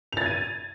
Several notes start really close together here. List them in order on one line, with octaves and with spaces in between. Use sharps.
F7 A6 G#6 D#7